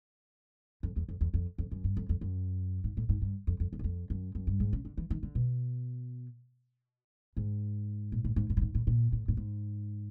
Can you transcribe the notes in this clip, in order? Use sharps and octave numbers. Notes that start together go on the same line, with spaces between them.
F2
E2
F2
E2
F2
F2
F#2
G2
F2
F2
F#2
G#2
A2
G#2
G2
F2
F2
E2
F#2
F2
F#2
F#2
G2
G#2
C#3
D3
E3
D#3
D3
B2
G#2
A#2
A2
G#2
G#2
A2
G#2
A2
A#2
A2
A2
G#2